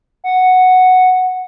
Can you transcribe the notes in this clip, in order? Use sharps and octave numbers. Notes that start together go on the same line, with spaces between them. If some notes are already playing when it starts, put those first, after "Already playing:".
F#5